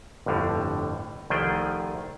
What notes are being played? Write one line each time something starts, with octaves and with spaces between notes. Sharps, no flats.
G1 F2 A2 D3 G3
C2 D#3 F3 A3 G#4 G5